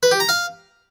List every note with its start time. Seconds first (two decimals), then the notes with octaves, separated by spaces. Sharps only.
0.03 B4
0.11 G4
0.20 A#5
0.29 F5